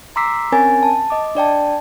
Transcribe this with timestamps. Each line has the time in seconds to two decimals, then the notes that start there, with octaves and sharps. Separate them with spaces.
0.16 A#5 C6 D6 E6 B6 C7
0.52 C4 C#4 A#4 C#5 G#5 A6
0.83 A5
1.10 D#5 D6
1.35 D4 D5 G5 A5